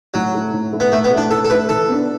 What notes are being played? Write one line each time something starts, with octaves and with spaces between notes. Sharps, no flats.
A2 F#3
A3 E4
A2
A3 E4
B3
A2 A3
B3
A3
D4 E4
A2 A4
A4
A3 E4 B4
E3 A4
B3 D4